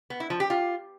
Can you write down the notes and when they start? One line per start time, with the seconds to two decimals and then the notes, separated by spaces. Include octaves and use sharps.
0.10 B3
0.20 E4
0.30 F3
0.40 G4
0.50 F4